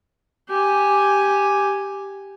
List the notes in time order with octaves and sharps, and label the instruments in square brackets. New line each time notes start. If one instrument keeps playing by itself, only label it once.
[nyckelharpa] G4 G#5